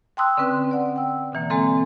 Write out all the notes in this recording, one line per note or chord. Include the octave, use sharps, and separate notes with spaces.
G5 A5 C6 D#6 E6 F#6
D3 C4 C#4 B4 G5
D5 F#5
G5 E6
B2 D3 E3 A#3
G#3 A#3 C4 A4